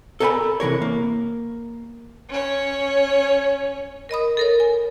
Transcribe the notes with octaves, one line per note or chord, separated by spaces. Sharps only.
A4 A#4 C#5 G5 G#5 B5
C3 E3 A#4 C#5
A#3
C#4 C#5
A#4 D#5 B5 D#6
A4 A#4 C#5
G#5